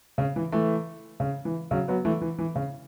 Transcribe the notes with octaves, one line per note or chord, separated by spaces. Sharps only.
C#3
E3
E3 A3
C#3
E3
C#3 F#3
F#3 B3
E3 A3
E3
E3
C#3